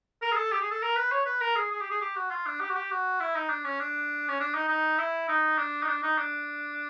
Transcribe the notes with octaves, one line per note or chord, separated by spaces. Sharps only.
A#4
G#4
A4
G4
G#4
A4
A#4
B4
C#5
B4
A#4
G#4
G#4
G4
G#4
G4
F#4
F4
D4
G4
F#4
G4
F#4
E4
D#4
D4
C#4
D4
C#4
D4
D#4
D#4
E4
D#4
D4
D#4
D4
D#4
D4